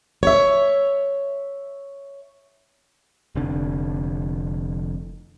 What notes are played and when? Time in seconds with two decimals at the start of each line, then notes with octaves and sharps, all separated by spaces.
0.23 C#5 E5
3.35 F1 D3